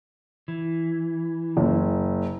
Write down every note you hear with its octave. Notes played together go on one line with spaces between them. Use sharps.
E3
F#1